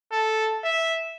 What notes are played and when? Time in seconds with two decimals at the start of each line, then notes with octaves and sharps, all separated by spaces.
0.12 A4
0.64 E5